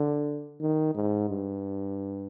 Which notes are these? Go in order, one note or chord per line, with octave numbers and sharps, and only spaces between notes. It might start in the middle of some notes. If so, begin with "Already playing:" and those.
Already playing: D3
D#3
G#2
G2